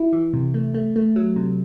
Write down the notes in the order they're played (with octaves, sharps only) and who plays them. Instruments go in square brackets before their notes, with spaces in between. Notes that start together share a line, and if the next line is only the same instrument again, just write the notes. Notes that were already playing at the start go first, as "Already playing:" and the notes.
Already playing: [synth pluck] E4
E3
C3
A3
A3
A3
F#3
C3